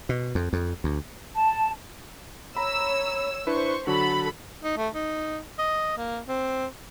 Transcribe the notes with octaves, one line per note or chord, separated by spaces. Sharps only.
B2
F2
F2
D2
A5
C#5 A#5 B5 E6
D4 E4 B4 C5 C#6
D3 F#3 F#4 A4 B5
D#4
A3
D#4
D#5
A#3
C4